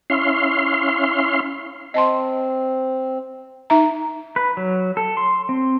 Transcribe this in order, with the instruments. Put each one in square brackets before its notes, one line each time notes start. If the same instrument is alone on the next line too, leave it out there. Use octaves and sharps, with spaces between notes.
[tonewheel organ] C#4 E4 F5 C6
[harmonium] C4 [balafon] D#5 A5 C6
[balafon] D#4 E5 A#5
[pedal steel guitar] B4
F#3
A4
C6
C4